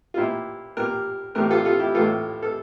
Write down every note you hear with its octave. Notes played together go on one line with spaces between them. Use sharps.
F4
A#2 E4 G4
A#2 G4 A#4
A2 E3 G4 A#4
F4 A4
F4 A4
E4 G4
A2 E3 F4 A4
A4